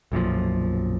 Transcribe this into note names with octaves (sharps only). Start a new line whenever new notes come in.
B1 F#2 A#2 F3